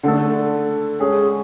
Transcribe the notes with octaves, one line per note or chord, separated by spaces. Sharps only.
D3 A3 D4 A4
G#3 C#4 G#4